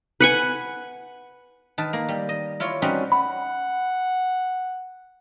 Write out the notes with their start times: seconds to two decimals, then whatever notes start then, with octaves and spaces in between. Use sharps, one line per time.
0.20 B4 F#5 G#5
1.78 D#3 B4 A5
1.93 A#3
2.09 G3
2.29 D#5
2.60 E4 F4 C#5
2.82 G3 C4 C#4 D#4 F#4 B4
3.12 F#5 B5